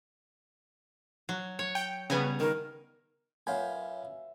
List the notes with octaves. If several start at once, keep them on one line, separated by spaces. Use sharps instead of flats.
F#3
C#5
G5
C#3 G3 B3 G#5 A#5
D#3 A#4
F#2 F4 B4 C#5 E5 F#5 G#5 B5